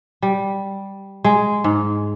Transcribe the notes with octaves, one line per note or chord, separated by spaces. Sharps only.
G3
G#3
G#2